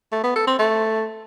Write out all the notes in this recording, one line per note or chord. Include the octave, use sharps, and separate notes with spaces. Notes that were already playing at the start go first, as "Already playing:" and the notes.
A3
B3
A4
C4
A3